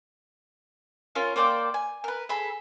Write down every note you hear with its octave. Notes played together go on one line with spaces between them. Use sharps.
C#4 F4 A#4 C#5
A#3 C5 D5 G5
G#5
A#4 B4
G#4 A4 B5